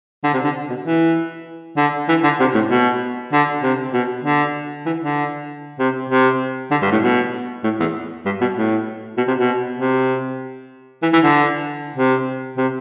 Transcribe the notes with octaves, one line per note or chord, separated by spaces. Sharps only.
D3
C3
D3
B2
E3
D3
E3
D3
C3
A2
B2
D3
C3
B2
D3
E3
D3
C3
C3
D3
G2
A2
B2
A2
E2
G2
B2
A2
B2
C3
B2
C3
E3
E3
D3
C3
C3